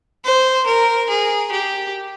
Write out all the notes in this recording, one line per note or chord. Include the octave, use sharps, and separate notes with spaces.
C5
A#4
G#4
G4